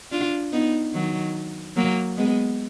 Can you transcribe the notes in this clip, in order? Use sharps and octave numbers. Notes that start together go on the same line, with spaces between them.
D4 F4
B3 D#4
D#3 F#3
F#3 A#3
G#3 B3